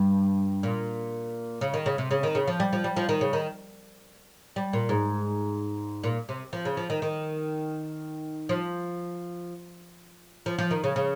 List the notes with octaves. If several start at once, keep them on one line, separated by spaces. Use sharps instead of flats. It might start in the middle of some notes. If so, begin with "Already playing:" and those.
Already playing: G2
A#2
C#3
D#3
C#3
C3
C#3
D#3
C#3
F3
G3
F3
G3
F3
D#3
C#3
D#3
G3
A#2
G#2
A#2
C3
F3
C#3
F3
D#3
D#3
F3
F3
F3
D#3
C#3
C#3